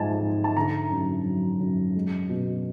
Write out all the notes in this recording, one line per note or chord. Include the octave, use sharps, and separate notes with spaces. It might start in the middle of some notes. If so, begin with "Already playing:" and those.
Already playing: G#2 F3 G#3 G#5 A5
G#2
A5
D3 A#5
F#2
F#3
F#2
G#3
B2